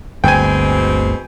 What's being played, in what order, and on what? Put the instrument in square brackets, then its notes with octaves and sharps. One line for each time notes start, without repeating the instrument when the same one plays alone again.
[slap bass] G1 D2 [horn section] B2 G#3 C4 [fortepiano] G5 G#5